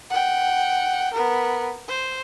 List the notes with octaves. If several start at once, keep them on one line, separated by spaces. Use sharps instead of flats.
F#5 G5
B3 A#4
C5